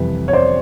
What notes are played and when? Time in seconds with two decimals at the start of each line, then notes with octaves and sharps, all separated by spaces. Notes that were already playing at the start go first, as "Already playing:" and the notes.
Already playing: F2 C3 E3 G3 B4
0.28 C#5
0.33 C5 D5